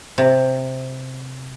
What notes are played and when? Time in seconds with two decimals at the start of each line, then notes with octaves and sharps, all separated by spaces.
0.18 C3